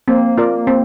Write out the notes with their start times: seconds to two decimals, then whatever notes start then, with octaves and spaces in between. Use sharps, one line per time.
0.08 A#3 C4
0.38 F4 A#4 D5
0.67 C4